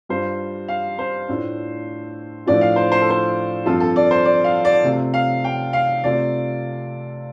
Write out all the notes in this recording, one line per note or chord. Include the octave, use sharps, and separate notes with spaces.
G2 G3 F4 C5
F5
C5
A2 A3 D4 F4
A2 F3 A3 D4 F4 D5
F5
C5
C5
A4
C5
G2 F3 C4 F4 A4
A4
D5
C5
D5
F5
D5
C3 A3 F4
F5
G5
F5
C3 A3 F4 D5